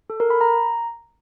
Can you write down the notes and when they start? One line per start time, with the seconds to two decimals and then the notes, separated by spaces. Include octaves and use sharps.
0.10 A4
0.20 A#4
0.30 B5
0.41 A#5